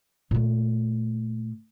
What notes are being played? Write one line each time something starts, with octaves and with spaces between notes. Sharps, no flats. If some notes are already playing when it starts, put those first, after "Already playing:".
A#2 A3